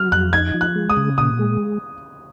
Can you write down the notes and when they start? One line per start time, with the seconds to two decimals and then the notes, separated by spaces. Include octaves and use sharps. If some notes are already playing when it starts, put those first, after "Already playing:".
Already playing: F#3 F6
0.12 F2 F#6
0.33 D#4 G#6
0.54 F3
0.61 F#6
0.76 G#3
0.90 D#6
0.97 C#3
1.18 A#2 D#6
1.39 G#3